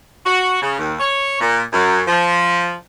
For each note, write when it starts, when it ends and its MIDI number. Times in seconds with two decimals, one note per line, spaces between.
0.26 0.57 66
0.62 0.77 49
0.78 0.94 39
1.00 1.40 73
1.41 1.61 46
1.73 2.01 42
2.07 2.72 53